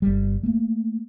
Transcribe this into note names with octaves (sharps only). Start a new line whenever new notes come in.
G1 G3
A3 A#3